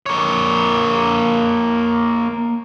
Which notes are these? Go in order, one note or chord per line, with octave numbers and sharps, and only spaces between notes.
A#3 C#5